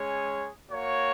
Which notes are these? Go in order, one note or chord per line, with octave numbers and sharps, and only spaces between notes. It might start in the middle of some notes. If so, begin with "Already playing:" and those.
Already playing: G#3 C#4 G#4 C#5
A#3 F#4 C#5